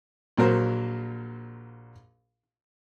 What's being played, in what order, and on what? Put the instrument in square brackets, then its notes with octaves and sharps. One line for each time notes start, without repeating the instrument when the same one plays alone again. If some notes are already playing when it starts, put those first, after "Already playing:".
[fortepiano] A#1 A#2 F#3 A#4 C5